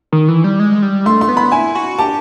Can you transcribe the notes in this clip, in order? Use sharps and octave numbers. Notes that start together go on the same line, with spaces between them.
D#3
E3
G3
G#3
G3
A3 C6
C6
B3
B5
E4 G#5
F#4
G4 A5